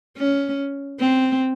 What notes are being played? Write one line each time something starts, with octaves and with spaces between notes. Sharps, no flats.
C#4
C4